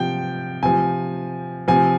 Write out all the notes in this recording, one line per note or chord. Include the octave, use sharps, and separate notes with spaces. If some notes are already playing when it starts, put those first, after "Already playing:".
Already playing: C3 F3 G5
C3 F3 G#5
C3 F3 G#5